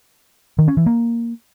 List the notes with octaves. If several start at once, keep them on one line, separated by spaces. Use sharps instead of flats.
D#3
C#4
E3
A#3